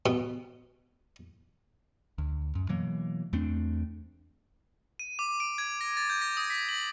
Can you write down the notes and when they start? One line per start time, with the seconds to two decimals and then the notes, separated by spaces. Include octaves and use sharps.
0.06 B2
2.18 D2
2.55 F#2
2.69 B2 E3 F#3 A#3
3.33 E2 A3 C4 D4
4.99 D#7
5.19 D6
5.40 D7
5.58 G#6
5.81 A#6
5.97 A6
6.10 G6
6.22 A#6
6.37 D#6
6.50 B6
6.69 F#7